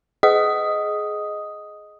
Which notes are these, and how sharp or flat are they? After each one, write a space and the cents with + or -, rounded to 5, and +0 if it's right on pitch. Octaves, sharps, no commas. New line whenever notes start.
G#4 +20 D#5 +0 D#6 +5